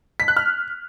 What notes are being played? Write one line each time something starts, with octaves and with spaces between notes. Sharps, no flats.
B6
F#6
F6